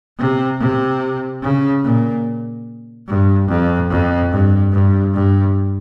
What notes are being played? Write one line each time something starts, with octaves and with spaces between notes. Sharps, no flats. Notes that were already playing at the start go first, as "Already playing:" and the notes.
C3
C3
C#3
A#2
G2
F2
F2
G2
G2
G2